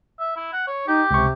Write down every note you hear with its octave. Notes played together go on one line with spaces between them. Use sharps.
E5
E4
F#5
C#5
D#4 G4
C#2 C3 C#6